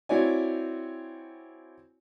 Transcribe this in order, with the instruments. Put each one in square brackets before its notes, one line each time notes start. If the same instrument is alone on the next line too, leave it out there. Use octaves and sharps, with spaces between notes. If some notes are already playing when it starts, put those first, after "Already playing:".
[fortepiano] C4 E4 F#4 C#5 D5 G#5